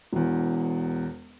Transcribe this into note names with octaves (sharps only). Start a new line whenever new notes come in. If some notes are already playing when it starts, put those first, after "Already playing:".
E1 E2